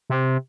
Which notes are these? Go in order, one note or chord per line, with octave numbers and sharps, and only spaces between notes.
C3